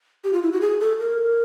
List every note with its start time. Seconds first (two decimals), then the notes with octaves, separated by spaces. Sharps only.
0.24 G4
0.33 F4
0.42 E4
0.52 F#4
0.61 G#4
0.80 A4
0.99 A#4